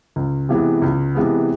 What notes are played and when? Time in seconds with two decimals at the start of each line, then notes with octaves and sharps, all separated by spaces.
0.16 C#2
0.49 C3 E3 G#3 B3
0.82 C#2
1.15 C3 E3 G#3 B3